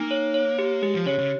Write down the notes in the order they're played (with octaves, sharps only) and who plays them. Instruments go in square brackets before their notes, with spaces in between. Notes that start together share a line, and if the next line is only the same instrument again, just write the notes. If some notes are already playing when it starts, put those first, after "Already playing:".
Already playing: [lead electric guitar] A#3 [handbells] D#4
[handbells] C#5
C#5
G4
[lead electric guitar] G#3 [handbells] G4
[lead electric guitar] F3
[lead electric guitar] C#3 [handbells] C#5
[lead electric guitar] C#3